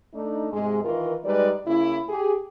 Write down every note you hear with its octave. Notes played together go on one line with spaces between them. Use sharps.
A3 D4 D#4
G#2 C3 G#3
D#3 E3 F4 A#4
G3 G#3 D#4 B4 D5
C#3 A#3 E4
G4 G#4